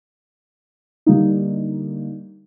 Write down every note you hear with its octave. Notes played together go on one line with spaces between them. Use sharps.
D3 G3 A#3 D#4